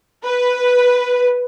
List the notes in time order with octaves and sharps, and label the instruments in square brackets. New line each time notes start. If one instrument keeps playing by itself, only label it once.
[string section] B4